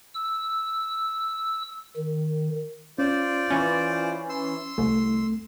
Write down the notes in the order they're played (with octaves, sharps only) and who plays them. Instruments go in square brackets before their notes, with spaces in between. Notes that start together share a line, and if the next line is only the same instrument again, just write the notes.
[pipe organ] E6
D#3
[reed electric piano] C#4 [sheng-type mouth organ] F4 C5 D5
[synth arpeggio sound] E3 C#4 [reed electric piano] A6
[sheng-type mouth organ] C6 E6
[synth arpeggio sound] C2 [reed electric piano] A3